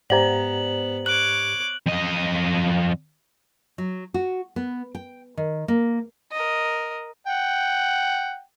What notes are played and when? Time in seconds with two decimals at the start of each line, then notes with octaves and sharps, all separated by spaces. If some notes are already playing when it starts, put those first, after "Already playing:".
0.10 G#2 B3 G4 C5 D5 A#5 F#7
1.06 C#5 D6 F#6 F#7
1.86 F2 D#5
3.78 F#3
4.14 F#4
4.56 B3
4.95 G5
5.37 D#3
5.68 A#3
6.32 A#4 D#5
7.27 F#5 G5